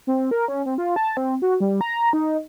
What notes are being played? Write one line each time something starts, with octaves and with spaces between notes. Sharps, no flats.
C4
A#4
C#4
C4
F4
A5
C4
F#4
G3
A#5
D#4